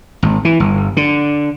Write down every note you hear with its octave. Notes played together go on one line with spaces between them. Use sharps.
G#1
E3
G1
D3